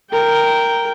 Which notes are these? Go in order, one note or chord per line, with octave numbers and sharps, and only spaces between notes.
A#4 G5